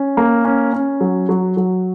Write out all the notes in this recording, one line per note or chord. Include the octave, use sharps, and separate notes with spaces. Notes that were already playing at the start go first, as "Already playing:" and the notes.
Already playing: C#4
A#3
C#4
C#4
F#3
F#3
F#3